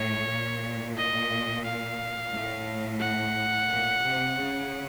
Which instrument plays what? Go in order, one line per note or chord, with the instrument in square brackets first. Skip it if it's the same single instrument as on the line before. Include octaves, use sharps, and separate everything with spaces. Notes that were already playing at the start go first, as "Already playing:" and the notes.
Already playing: [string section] A2 [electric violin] C#5
[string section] A#2
[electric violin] D#5
F5
[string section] A2
[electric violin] F#5
[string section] A#2
C3
C#3